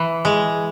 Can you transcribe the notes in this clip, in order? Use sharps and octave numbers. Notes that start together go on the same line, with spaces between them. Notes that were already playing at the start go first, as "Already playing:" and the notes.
Already playing: E3
G#3